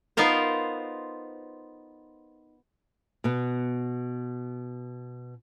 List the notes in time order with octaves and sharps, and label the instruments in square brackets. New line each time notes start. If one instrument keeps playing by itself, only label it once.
[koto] B3 D#4 F4 A#4 C5
[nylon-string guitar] B2 B3